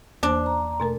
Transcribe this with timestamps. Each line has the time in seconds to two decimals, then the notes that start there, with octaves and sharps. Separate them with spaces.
0.23 E2 A#3 D4 C5
0.46 A#5
0.80 B2 A3 A#4